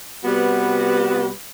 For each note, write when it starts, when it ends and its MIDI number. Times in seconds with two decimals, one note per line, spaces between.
0.24 1.29 48
0.24 1.29 55
0.24 1.29 59
0.24 1.29 66
0.24 1.29 71